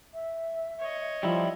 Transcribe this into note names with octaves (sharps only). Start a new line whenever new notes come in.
E5
C#5 D#5
F3 G3 E4